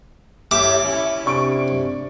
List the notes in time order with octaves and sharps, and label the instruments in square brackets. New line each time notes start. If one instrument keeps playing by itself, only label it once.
[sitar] A2 G4 E5 [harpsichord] D6
[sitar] C#4 E4
[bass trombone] C3 [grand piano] D4 C#6 D7